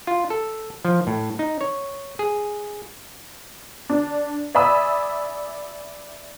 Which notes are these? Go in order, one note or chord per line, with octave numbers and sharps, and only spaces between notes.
F4
A4
F3
A2
D#4
C#5
G#4
D4
D5 E5 G#5 B5 D#6 E6